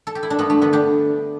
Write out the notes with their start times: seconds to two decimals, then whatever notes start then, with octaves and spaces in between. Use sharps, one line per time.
0.07 A4
0.15 G4
0.23 E4
0.30 D4
0.39 G2 B3
0.50 A3
0.62 D3 B3
0.73 D4 G4